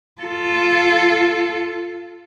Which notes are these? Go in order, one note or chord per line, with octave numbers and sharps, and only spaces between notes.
F4 A4